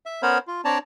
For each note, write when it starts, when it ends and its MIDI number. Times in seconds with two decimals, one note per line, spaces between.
0.06 0.22 76
0.22 0.38 59
0.22 0.38 61
0.22 0.38 70
0.22 0.38 72
0.22 0.38 73
0.22 0.38 83
0.48 0.61 65
0.65 0.78 60
0.65 0.78 62
0.65 0.78 73
0.65 0.78 74
0.65 0.78 81
0.65 0.78 82